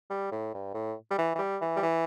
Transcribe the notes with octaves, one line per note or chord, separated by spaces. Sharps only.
G3
A2
G2
A2
G3
E3
E3
G3
E3
G3
E3